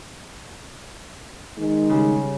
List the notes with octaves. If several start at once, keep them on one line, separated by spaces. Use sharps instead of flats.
D#3 G#3 D#4
C#3 G3